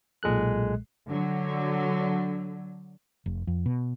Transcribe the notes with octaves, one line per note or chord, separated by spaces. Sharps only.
B1 A#2 G#3 A4 F#6
D3 F#3
F1
F2
B2